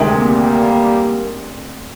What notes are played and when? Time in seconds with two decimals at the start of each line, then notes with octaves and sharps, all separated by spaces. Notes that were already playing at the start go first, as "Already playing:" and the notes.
Already playing: D2 C3 D#3 G#3
0.21 G3 A#3